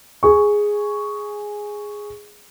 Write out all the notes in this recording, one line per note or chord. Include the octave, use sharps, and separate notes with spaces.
G#4 C#6